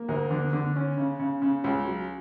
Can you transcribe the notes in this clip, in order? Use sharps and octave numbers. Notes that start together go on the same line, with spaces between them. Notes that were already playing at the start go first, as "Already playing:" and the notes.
Already playing: A#3
D2 A#4
D3
D3
C#4
C#3
C#3
C#3
C#2
F#3